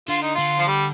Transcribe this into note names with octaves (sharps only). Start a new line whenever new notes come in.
D3 F4
D#4
D3 F4
F3
G3